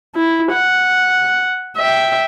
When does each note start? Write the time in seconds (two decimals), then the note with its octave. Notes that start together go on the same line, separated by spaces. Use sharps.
0.15 E4
0.52 F#5
1.77 E5 G5